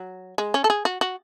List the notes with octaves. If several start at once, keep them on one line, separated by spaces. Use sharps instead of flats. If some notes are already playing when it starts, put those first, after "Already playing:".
Already playing: F#3
G#3
C#4
A4
G#4
F#4
F#4